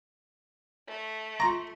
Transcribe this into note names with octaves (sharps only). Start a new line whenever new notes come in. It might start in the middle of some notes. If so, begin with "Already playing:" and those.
A3
F4 A#5 C6 C#6